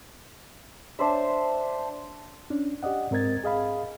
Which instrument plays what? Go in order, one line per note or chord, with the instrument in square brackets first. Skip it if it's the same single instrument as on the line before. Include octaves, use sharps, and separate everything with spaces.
[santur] D4 C5 E5
[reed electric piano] C#4 D4
G4 D5 D#5 F#5
G#2 C4 A#4 D#5 G#6 A6
G#4 D#5 F5 B5